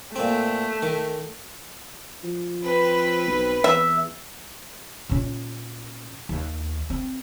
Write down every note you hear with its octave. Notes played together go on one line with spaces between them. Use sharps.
A#2 A3 C4
D#3
F3
C4 B4
B1
E2 E5
A#2 C#4
D#2
C4